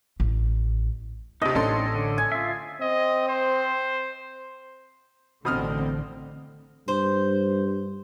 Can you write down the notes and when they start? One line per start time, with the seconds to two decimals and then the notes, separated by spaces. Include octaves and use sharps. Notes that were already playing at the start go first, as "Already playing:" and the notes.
0.20 A1
1.42 D#2 C3 C4 D4 D#4 D#5
1.55 A1 C#4 A4 C6
1.95 D3
2.18 G#5
2.32 F4 E5
2.81 C4 D#5
3.28 C5
5.45 A1 B2 D3 C4 D#6 F6
6.88 G2 C5